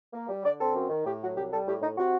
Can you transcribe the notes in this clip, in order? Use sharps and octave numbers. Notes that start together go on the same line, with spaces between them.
A#3
G3
D3 D5
C4 A4
F#2
D#3
A2 G4
F#3 F#4
C2 G4
G3 A4
A2 G4
A2 D#4
C3 F#4